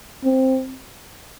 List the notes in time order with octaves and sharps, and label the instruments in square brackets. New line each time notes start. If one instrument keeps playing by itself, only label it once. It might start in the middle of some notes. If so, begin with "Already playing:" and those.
[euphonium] C4